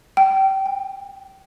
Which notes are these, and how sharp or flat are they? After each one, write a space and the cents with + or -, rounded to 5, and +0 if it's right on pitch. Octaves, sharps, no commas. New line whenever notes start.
G5 -25
G5 +30